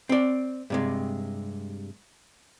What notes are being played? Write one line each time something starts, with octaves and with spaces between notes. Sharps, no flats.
C4 D5
G2 C3 G#3